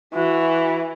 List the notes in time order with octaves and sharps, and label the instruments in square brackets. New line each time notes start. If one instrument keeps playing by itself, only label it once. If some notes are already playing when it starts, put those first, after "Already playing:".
[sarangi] E3 [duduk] F#4